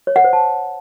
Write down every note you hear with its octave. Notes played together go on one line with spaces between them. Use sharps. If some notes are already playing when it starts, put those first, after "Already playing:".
C#5
F#5
C5
A5